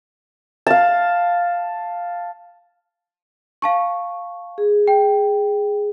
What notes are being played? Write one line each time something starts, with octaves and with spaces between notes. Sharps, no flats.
F5 A5
F5 A5 C#6
G#4
G5